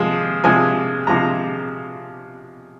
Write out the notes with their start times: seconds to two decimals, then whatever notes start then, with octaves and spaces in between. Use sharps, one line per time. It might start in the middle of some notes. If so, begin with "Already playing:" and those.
Already playing: C3 F3 G#3
0.44 C3 F3 G#3 G#5
1.07 C3 F3 G#3 A#5